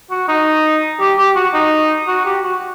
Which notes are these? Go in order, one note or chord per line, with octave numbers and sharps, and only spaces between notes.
F#4
D#4
G4
G4
F#4
D#4
F#4
G4
F#4